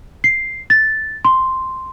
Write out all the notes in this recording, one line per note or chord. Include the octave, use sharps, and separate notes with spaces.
C7
A6
C6